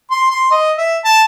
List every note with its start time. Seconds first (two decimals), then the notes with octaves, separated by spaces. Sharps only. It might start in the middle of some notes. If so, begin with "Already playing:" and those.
0.11 C6
0.30 C6
0.51 D#5
0.78 E5
1.04 A5